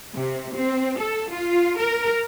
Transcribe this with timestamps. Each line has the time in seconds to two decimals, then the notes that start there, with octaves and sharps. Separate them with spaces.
0.14 C3
0.54 C4
0.98 A4
1.30 F4
1.78 A#4